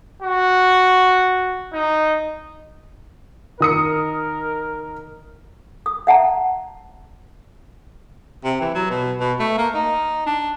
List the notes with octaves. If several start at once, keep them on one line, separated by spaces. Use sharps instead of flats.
F#4
D#4
D#3 A#4 D#6 C#7
D#6
E5 F#5 A5 A#5
C3
E3
F#3
B2
B2
A3
A#3
D#4
D4